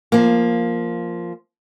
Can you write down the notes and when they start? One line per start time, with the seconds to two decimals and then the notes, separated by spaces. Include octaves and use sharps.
0.12 F3 A#3